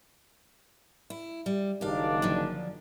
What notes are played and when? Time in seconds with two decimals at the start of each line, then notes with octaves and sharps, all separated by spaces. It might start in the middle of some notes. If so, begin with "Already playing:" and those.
1.10 E4
1.46 G3
1.81 F#1 D#3 D4 G4 F5
2.22 F#2 D3 F3